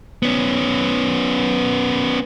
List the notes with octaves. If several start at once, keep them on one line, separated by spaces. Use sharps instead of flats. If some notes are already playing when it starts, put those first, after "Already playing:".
B3 C#4